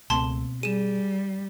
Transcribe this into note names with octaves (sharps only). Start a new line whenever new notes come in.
C#2 B2 A3 A#3 C4 A5 C6
G3 G#4 D#7 E7